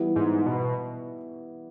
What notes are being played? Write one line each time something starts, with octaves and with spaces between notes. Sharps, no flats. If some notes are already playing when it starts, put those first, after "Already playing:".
Already playing: E3 G3 B3 E4
G#2
B2